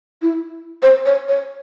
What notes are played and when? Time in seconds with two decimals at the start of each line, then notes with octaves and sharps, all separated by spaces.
0.22 E4
0.82 C5
1.06 C#5
1.28 C#5